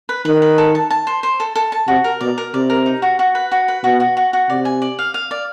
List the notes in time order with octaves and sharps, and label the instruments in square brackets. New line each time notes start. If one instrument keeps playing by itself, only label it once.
[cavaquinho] B4
[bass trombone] D#3 [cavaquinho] B4
[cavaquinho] B4
A4
A5
A5
C5
C5
A4
A4
A5
[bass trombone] C3 [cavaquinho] F#4
[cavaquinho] A#4
[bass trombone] B2 [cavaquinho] D5
[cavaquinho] A#4
[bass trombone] C3 [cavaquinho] D5
[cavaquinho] A#4
D#4
F#4
F#4
B4
F#4
B4
[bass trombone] B2 [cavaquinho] F#4
[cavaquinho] F#4
F#4
F#4
[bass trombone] C3 [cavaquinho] D5
[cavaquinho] G#5
D5
F5
F5
D5